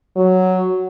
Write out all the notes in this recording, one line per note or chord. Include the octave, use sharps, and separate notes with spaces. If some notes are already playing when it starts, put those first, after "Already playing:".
F#3